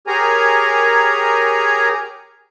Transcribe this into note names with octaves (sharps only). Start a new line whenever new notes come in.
G4 G#4 A#4 C#5 G#5 A#5